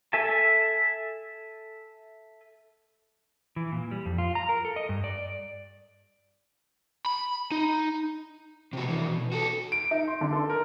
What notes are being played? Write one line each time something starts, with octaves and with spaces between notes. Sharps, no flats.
A4 E5 G#5 A5
E3
A#2
G3
F2
F4
A#5
A#4
A4
D#5
G2
D5
B5
D#4
C3 F#4
C3 E3
B2
F#4 A4
D7
D#4
C6
D3
A4
A#4